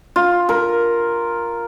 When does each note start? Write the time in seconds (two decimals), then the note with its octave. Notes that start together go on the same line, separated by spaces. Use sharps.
0.16 F4
0.49 A#4